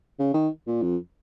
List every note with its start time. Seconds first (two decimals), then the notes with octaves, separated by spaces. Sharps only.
0.19 C#3
0.34 D#3
0.67 A#2
0.82 F2